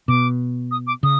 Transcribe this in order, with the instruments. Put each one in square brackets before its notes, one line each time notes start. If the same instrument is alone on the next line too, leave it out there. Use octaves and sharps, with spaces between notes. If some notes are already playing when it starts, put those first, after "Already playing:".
[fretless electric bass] B2 [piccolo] D6
[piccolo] D#6
D6
[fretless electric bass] C#3 [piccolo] D#6